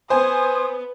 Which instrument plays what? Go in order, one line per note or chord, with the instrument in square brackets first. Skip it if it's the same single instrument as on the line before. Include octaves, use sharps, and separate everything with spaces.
[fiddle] B3 [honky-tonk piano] C5 G#5 [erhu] D#6